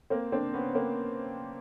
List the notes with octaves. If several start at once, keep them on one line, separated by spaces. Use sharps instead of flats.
A#3 C4
C4 D4
B3 C#4
A#3 C4